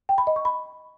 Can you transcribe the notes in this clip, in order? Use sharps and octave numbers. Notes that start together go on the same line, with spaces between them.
G5
B5
D#5
C#6
B5